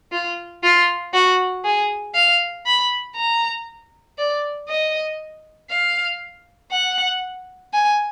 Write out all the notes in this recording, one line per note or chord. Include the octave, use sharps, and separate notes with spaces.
F4
F4
F#4
G#4
F5
B5
A#5
D5
D#5
F5
F#5
G#5